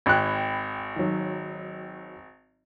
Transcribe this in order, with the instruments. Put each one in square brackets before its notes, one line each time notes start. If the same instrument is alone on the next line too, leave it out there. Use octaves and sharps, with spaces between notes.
[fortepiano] G#1 F#6 [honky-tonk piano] G5 B5 G#6
[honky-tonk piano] D#3 F#3